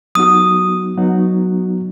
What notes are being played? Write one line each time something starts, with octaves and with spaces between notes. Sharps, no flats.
F#3 B3 D#4 F#4 D#6
F#3 B3 D#4 F#4